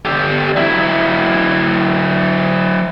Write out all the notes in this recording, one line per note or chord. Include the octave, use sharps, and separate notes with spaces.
D3 G4
F#3 E4